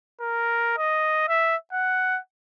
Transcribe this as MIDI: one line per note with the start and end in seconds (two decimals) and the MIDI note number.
0.21 0.77 70
0.77 1.27 75
1.28 1.56 76
1.73 2.19 78